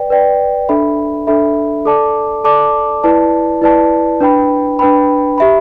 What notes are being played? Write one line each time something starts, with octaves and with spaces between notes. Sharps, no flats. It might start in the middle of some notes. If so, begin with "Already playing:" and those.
Already playing: B4 D5 G5
B4 D5 G5
D4 A4 E5 B5
D4 A4 E5 B5
A4 D5 A5 D6
A4 D5 A5 D6
E4 B4 D5 A5
E4 B4 D5 A5
D4 B4 G5 B5
D4 B4 G5 B5
G4 E5 B5